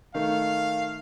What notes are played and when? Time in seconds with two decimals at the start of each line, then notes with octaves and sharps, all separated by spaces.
0.15 D#3 A3 F5